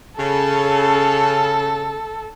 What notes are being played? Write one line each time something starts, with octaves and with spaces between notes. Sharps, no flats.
C#3 A4